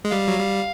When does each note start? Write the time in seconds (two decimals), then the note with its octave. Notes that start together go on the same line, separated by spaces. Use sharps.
0.05 G#3
0.11 G3 F5
0.28 F#3
0.39 G3